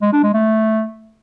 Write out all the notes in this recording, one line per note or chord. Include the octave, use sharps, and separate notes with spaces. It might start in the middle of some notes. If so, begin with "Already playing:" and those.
G#3
D4
G#3
A3